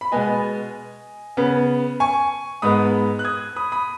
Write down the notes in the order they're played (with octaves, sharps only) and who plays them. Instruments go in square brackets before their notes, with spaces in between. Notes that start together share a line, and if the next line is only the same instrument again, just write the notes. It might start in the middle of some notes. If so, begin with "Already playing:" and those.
[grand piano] B5
B2 G#3 B3 D#5 G#5
C#3 B3
G#5 C#6
G#2 G#3 B3 B5 D#6
F#6
D#6 G#6
B5 D#6
B5 D#6